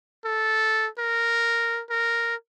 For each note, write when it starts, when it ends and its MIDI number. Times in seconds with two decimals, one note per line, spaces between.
0.25 0.88 69
0.99 1.82 70
1.90 2.35 70